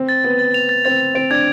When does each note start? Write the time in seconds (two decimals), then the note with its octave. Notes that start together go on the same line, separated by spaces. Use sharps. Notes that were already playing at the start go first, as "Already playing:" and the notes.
Already playing: C4
0.09 A6
0.24 B3 A6
0.39 A6
0.54 F7
0.69 A6
0.85 C4 A6
1.01 A6
1.15 C4 D7
1.30 D4 G#6